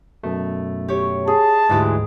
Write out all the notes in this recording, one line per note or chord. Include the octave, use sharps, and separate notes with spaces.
F#2 B2 A3
G4 C#5
G#4 A5
D2 G#2 E3 G#3 G4